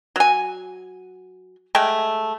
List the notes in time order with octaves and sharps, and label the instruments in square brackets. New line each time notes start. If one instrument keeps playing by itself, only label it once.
[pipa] F#3 G#5
G#3 A3 E5 G5